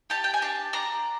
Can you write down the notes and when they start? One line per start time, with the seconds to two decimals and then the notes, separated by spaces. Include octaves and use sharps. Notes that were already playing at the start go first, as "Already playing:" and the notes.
0.10 G4 A5
0.24 G5
0.34 G#5
0.42 D4 A5
0.73 D4 A#5